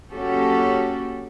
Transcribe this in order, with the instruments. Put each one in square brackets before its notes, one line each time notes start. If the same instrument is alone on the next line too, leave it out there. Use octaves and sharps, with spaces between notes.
[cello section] F#2 A#3 C#4 F#4 G4 A4